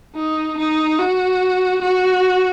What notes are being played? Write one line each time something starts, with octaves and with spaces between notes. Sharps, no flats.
D#4
D#4
F#4
F#4